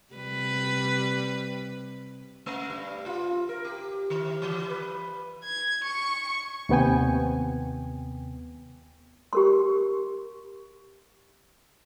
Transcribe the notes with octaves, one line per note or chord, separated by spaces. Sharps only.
C3 G3 B4
A3
G2
F4
A#4
G4
D#3
E3
B4
G#6
C#6
D#2 C3 B3 G5 G#5
G4 A#4 C6